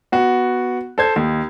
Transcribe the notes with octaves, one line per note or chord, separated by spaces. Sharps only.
B3 F#4
A4 C5 G#6
D#2